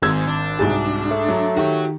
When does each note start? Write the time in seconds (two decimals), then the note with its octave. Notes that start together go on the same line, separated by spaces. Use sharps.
0.02 G#1 G#2 E6 G#6
0.27 D4
0.59 C2 G#2 F#4 G#4 A6
1.11 A3
1.28 F#3
1.57 D#3 F#4 G4 C#5